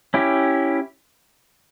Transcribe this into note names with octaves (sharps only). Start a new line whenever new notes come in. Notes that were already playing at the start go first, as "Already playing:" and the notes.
C#4 E4 G4